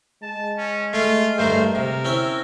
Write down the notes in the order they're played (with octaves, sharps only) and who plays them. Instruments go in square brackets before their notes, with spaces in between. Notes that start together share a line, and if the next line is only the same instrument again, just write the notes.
[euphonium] G#3 [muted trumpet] A5
[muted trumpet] C#4
[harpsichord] A3 [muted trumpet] F4
[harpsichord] G2 A3 A#4 [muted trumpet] C5
[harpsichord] C3 [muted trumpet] A#4
[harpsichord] C4 C#4 E5 [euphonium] E4